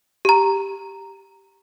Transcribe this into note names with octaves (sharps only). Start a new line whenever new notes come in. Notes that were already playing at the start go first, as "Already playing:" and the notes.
G4 A#5